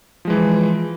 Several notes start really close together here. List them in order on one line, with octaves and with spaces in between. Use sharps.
F3 G#3 E3